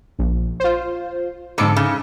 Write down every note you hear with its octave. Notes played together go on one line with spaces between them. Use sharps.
A#1
F4 C5
F2 G#2 D3 D6 C#7
C#3